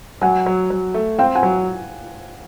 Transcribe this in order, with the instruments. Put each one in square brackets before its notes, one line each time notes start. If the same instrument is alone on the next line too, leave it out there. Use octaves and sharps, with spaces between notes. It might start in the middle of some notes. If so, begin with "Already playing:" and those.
[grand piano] F#3 [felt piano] F#5 G#5
[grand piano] F#3
F#3
A3
[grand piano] C4 [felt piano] F5 G5
[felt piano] F#5 G#5
[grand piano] F#3